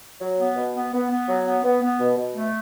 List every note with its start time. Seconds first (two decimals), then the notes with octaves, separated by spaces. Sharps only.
0.20 F#3
0.38 B3
0.56 B2
0.73 B3
0.92 B3
1.09 B3
1.28 F#3
1.45 B3
1.63 B3
1.81 B3
2.00 B2
2.17 B2
2.35 A3